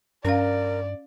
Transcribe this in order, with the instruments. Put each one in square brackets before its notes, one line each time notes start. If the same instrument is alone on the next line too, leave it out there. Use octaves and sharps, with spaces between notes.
[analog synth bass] G2 [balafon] C#4 F5 [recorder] A#4 [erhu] D5